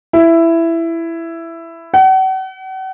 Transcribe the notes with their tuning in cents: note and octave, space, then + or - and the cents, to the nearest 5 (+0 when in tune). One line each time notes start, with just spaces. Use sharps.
E4 +10
F#5 +40